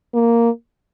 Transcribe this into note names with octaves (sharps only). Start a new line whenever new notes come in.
A#3